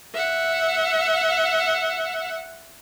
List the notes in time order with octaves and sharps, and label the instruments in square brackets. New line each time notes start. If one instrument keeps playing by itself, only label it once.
[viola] E5 F#5